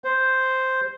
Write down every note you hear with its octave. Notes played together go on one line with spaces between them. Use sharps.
C5